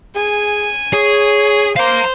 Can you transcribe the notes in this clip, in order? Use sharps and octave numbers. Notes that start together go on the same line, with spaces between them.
G#4 G#5
G#4 C#5
C5 F5 A#5 G6